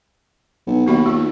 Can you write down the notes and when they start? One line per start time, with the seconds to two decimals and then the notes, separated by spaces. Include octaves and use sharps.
0.67 B1
0.86 D#2 B3 F#4 B5
1.06 A3 F4